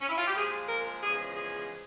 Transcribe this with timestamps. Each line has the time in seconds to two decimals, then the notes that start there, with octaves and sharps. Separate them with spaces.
0.01 C#4
0.09 E4
0.18 F4
0.27 G4
0.35 A#2 F3 G#3 G#4
0.69 A#4
1.03 E2 C#3 F3 G#3 G#4
1.36 G#4